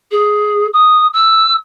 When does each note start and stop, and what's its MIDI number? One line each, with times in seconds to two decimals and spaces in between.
0.11 0.66 68
0.73 1.06 87
1.13 1.53 88